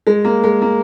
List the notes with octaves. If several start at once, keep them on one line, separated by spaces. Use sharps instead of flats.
G#3
A#3
G#3
A#3